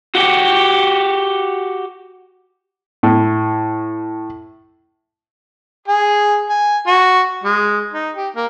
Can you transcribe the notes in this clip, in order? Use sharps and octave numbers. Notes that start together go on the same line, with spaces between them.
F#4 G4
A2
G#4
G#5
F#4
G#3
D#4
G4
A#3